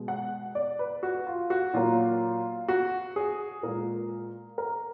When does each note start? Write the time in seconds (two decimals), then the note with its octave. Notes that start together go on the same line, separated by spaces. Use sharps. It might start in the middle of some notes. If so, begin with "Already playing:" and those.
Already playing: B2 G#3
0.08 F#5
0.55 D5
0.79 B4
1.03 F#4
1.27 F4
1.50 F#4
1.73 A#2 F#3 A#3 F4
2.68 F#4
3.16 G#4
3.63 A#2 G#3 A#4
4.58 A#4